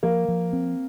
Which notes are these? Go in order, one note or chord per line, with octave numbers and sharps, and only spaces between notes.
F3 A#3
F3
C4